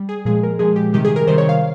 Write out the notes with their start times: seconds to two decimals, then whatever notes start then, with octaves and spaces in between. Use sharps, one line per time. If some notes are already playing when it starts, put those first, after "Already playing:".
Already playing: G3
0.09 G#4
0.25 A#2 F3 G#3 G#4
0.43 A#4
0.59 A#2 F3 G#3 G#4
0.76 G4
0.93 C3 D#3 G3 G4
1.05 G#4
1.16 A#4
1.27 C3 D#3 G3 C5
1.38 C#5
1.49 F5